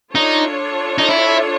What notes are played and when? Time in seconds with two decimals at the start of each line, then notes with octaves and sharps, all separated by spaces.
0.15 D4 D#4 F4 A4 C#5
0.98 D#4
1.09 E4